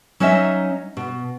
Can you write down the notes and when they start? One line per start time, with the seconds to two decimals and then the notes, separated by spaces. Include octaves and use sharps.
0.20 F#3 C#4 D#4 D#5 E5
0.97 B2